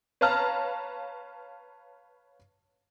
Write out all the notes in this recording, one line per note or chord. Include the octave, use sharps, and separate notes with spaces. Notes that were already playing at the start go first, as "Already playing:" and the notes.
B4 C#5 F5 A5 A#5 F6